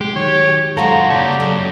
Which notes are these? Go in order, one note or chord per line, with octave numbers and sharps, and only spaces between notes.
G#3 G4
D#3 F#3 C#5
F#2 G#3 F4 F#4 A4 C5 A#5
C#3 A#3 G4 C#5 D5 A5
F#2 A4 D#5